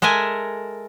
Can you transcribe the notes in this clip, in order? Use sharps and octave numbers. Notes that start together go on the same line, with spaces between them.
G#3 A4 A#4 E5 G#5